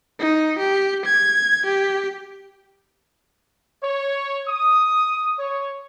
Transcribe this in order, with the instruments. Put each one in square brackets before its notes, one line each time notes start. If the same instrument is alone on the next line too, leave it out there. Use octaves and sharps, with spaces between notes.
[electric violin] D#4
G4
G#6
G4
[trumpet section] C#5
D#6
C#5